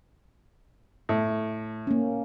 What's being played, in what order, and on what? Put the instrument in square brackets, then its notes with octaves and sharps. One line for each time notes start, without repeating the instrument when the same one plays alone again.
[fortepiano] A2
[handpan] A#3 C#4